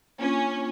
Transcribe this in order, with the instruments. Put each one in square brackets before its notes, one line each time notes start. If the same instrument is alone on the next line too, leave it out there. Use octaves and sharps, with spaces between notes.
[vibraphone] A#3 D4 F4 [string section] C#4